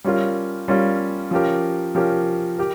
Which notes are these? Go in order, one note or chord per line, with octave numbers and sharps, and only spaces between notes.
G3 C#4 F4 A#4
G3 C#4 F4 A#4
F3 C#4 G4 A#4
F3 C#4 G4 A#4
G4 A#4